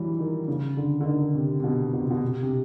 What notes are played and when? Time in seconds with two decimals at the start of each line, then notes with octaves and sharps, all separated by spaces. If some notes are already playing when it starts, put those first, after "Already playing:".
Already playing: E3 F#3 G3
0.19 D#3
0.48 C#3
0.77 D3
1.01 D3
1.06 D#3
1.35 C3
1.60 C3
1.64 B2
1.93 B2
2.01 C3
2.10 B2
2.22 C3
2.43 C3